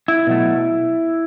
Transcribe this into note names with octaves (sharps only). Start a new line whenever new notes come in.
E4
B2 F#3 A3